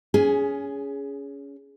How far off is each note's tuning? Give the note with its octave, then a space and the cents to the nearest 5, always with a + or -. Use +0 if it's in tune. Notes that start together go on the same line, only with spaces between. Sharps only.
C#4 +20 G#4 +0